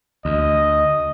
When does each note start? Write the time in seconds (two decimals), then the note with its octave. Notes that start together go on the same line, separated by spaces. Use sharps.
0.25 D2 D#5